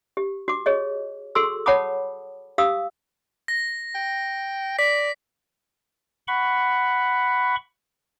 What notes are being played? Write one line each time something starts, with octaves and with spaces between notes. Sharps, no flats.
G4
F#4 D6
G#4 C#5 D#5
F#4 G#4 A4 C6 E6
C#5 F#5 A5 B5 D6 D#6
G4 F5 D#6 E6
A#6
G5
D5 B6
F#5 B5 C#6